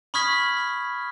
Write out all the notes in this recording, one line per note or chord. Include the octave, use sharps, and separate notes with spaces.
B5 C#6 D#6 F6 G#6 B6